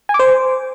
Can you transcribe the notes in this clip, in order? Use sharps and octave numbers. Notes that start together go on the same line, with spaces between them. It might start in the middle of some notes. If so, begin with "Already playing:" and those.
G#5
D6
C5